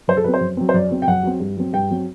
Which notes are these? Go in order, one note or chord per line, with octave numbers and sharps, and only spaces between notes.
F#2 C5
A4
F#3 C4 B4
C5
F#2
F#3 C4
C5
F#2 D5
F#3 C4
G5
F#2 F#5
F#3 C4
G2
F#3 C4
G2 G5
F#3 C4